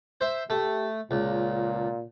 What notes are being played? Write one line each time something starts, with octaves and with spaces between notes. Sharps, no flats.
C5 E5
A3 G4
C#2 A#2